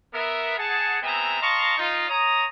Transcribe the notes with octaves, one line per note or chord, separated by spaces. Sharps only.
B3 A#4 E5
G#4 F#5 A5
G#3 B3 C4 E5 G#5 A#5
D#5 F5 A5 A#5 C6 C#6
D#4 F4
C#5 A#5 D#6